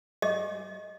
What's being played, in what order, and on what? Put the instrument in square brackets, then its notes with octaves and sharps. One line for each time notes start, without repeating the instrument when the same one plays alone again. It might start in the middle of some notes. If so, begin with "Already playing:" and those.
[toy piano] D#5